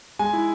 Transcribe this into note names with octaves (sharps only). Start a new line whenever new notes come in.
G#3 G#5
E4